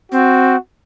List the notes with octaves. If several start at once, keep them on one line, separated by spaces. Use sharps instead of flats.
C4 F#4